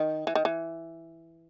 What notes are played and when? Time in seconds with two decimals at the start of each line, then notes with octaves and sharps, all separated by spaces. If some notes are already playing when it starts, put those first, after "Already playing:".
Already playing: D#3
0.27 E3
0.35 D#3
0.45 E3